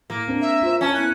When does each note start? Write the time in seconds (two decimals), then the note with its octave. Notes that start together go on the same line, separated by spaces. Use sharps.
0.10 A2 A#3
0.28 C4 D4 A#4
0.41 E5
0.63 F4 C5
0.81 C#4 A5
0.94 B3 E4 F#6